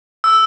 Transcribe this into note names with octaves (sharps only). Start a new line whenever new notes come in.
E6